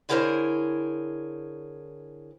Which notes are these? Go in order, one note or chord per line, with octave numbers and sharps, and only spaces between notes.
D3 E4 G#4 A#4 C5 C#5